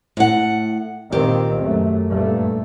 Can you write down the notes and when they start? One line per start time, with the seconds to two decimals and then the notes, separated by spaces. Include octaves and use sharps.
0.17 A2 F#5
1.12 A#2 D#3 C4 G4
1.59 F#2 A3
2.10 G2 A#2 A3